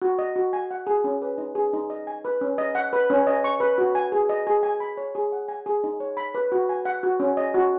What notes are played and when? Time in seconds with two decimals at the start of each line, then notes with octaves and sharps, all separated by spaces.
0.02 F#4
0.19 D#5
0.36 F#4
0.53 G#5
0.71 F#5
0.87 G#4
1.04 C#4
1.22 B4
1.38 D#4
1.55 G#4
1.73 D#4
1.90 D#5
2.07 G#5
2.25 B4
2.41 C#4
2.58 D#5
2.75 F#5
2.93 B4
3.10 C#4
3.27 D#5
3.44 C#6
3.60 B4
3.78 F#4
3.95 G#5
4.12 G#4
4.29 D#5
4.47 G#4
4.63 G#5
4.80 B5
4.97 C#5
5.15 G#4
5.32 F#5
5.48 G#5
5.66 G#4
5.84 D#4
6.00 C#5
6.17 B5
6.35 B4
6.52 F#4
6.69 G#5
6.85 F#5
7.03 F#4
7.20 C#4
7.37 D#5
7.54 F#4